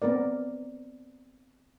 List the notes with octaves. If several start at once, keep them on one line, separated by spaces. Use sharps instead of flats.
B3 C4 A#4 D5